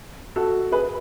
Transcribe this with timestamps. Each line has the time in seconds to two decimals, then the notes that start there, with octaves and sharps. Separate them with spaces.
0.36 F#4 A4
0.72 G#4 B4